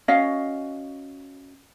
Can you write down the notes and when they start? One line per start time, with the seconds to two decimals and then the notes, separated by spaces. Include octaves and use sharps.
0.08 C#4 F#4 D#5 F5